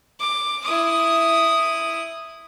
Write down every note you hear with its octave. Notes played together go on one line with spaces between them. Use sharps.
D6
E4 D#6